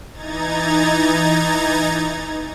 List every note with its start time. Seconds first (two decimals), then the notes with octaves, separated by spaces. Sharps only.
0.12 E3 D#4 A#5 G#6 A6